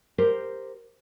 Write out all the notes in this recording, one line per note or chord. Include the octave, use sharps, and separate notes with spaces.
G4 A#4 C5